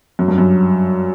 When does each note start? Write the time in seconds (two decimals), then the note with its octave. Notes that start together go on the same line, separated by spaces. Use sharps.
0.19 F#2
0.28 G2
0.38 F#2